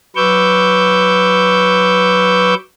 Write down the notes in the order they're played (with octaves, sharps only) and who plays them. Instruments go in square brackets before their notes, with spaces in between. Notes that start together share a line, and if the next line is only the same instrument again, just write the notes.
[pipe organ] F#3 B4 C#6 D6 E6 G6